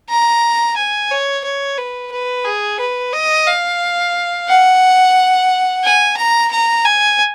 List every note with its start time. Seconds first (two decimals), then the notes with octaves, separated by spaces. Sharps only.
0.09 A#5
0.76 G#5
1.11 C#5
1.44 C#5
1.78 B4
2.11 B4
2.45 G#4
2.80 B4
3.13 D#5
3.47 F5
4.48 F#5
5.84 G#5
6.17 A#5
6.51 A#5
6.85 G#5